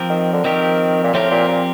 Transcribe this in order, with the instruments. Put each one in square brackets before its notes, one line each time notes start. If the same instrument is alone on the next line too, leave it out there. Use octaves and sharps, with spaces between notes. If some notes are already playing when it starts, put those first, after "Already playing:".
Already playing: [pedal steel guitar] F3 C4 G4 A#4
[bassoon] D#3
D3
[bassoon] D#3 [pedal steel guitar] F3 C4 G4 A#4
[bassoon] A#2
[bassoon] A2 [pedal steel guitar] F3 C4 G4 A#4
[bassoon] A#2
A#2